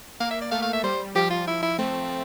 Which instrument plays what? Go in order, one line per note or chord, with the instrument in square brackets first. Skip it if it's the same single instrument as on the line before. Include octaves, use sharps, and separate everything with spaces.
[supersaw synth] A#3 [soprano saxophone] F5
[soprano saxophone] E5
D5
[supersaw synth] A3 [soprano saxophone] F5
[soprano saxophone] F5
E5
[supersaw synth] G3 [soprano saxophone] C5
[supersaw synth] F3 [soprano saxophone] G4
[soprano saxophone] F4
E4
E4
[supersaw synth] A3 [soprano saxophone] C4